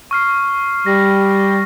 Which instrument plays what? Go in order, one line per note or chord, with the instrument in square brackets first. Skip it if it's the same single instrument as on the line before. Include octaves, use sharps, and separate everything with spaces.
[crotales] C#6 F6 C7
[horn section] G3 [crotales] A#6